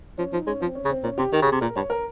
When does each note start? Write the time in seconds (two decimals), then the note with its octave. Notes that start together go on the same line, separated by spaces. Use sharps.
0.18 F3 C#4
0.33 F3 D#4
0.47 G#3 C#4
0.61 F3 C4
0.75 C#4
0.85 C#3
0.90 C4
1.03 A#2 C#4
1.18 C3 G4
1.32 D#3 G4
1.42 C#3
1.47 C3 G#4
1.61 A#2 A#4
1.76 G2 C#5
1.90 A#4